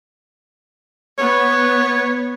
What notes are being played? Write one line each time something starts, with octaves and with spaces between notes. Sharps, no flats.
B3 C#5